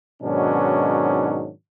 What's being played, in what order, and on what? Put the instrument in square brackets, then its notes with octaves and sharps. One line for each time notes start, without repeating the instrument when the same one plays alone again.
[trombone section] G#2 B2 D#3 F#3 C#4 D4